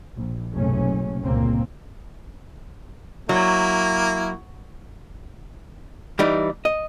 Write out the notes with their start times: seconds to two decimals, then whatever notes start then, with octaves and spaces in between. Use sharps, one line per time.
0.15 A#1
0.52 F#1 B1 G#2 C3 A3 C#4
1.24 G1 C#2 G2 A#2 A#3 C4
3.29 F#3 A#3 E4
6.19 E3 G3 D#4
6.65 D#5